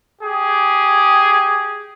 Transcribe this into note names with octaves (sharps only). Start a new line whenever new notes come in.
G4 G#4